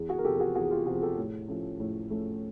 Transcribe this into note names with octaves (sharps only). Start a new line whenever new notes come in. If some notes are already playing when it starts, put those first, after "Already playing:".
Already playing: E2
F#4 G#4
A#4
C3 F3 G4 A4
A4
F#4 G#4
E2 F#4 G#4
F4 G4
C3 F3 F#4 G#4
G4 A4
A2
F3 A3 C#4
A2
F3 A3 C#4